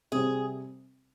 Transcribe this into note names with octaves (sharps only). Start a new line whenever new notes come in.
C3 G3 C4 G#4